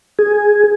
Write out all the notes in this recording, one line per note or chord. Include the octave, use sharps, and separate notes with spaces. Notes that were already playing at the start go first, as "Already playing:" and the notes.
G#4